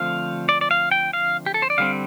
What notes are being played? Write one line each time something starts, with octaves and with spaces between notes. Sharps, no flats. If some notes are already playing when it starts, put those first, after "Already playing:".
Already playing: D3 F3 A3 C4 F5
D5
D5
F5
G5
F5
G4
A4
C5
D5
D3 G3 C4 F5